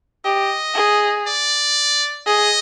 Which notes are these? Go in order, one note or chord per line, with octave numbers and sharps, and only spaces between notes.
G4 D#5
G#4
D5
G#4 D#5